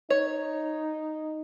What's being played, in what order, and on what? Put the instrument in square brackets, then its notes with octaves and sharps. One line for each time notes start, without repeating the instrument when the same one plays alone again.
[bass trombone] D#4 [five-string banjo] C#5